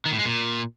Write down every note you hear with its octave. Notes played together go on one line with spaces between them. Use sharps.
D#3
A2
G#3
A#2